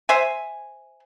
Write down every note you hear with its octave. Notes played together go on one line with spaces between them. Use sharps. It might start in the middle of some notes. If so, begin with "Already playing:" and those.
C5 E5 G#5